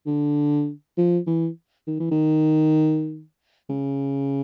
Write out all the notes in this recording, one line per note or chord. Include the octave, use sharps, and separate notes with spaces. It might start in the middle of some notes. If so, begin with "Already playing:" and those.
D3
F3
E3
D#3
E3
D#3
C#3